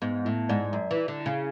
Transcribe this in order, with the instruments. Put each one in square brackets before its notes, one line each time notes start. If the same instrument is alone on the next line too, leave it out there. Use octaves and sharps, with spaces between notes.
[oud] G#2 [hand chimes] B3
[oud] A2 [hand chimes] E4
[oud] G#2 [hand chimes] D5
[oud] F#2 [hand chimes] D5
[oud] E3
[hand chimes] E4
[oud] D3
[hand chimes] E4
[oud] C#3